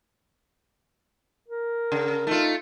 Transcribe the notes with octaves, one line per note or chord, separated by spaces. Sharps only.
A#4
C#3
A3 D#4 F4